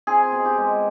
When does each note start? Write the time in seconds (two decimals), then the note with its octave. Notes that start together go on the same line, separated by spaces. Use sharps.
0.07 C4 G#4
0.32 B2
0.45 G4
0.58 G#3